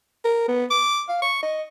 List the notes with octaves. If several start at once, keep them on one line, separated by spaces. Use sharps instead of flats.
A#4
B3
D6
F5
C#6
D#5